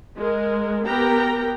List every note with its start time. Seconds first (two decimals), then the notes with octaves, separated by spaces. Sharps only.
0.17 G#3 A#4
0.85 B3 G4 A#4 G5 A#5